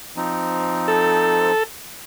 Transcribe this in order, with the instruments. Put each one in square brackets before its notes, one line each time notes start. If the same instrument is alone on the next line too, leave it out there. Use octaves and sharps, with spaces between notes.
[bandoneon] F3 C4 D#4
[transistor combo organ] A4